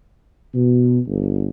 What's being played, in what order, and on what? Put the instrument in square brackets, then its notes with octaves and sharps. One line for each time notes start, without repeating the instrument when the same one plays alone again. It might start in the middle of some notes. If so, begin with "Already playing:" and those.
[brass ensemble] B2
G1